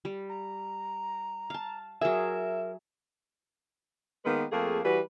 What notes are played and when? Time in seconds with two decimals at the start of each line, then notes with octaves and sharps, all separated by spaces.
0.05 G3
0.29 A#5
1.50 F5 A5
2.01 F#3 G#4 A#4 E5
4.25 D#3 G#3 A#3 B3 B4
4.52 F2 A3 A#3 G#4
4.84 E3 G3 F#4 B4